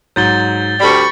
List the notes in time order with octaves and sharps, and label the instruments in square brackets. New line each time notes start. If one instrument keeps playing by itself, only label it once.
[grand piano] G#2 F#3 [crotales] G6 A6 G7
[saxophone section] D2 G3 [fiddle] B5 C#6